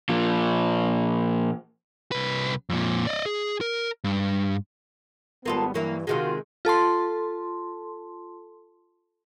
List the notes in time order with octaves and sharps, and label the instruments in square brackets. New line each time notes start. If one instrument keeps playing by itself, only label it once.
[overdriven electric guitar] A#2 F3
[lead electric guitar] C2 B4
F2 A#2
D5 D#5
G#4
A#4
G2
[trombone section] G#1 G3 B3 [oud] A#3 F4 A4
[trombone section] G2 E3 [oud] F#3 A#3 E4
[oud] C3 D#3 G#3 [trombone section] F4 F#4
[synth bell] F4 A4 A5 C6